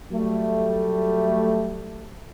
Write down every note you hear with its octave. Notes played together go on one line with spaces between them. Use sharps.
F#3 G3 A3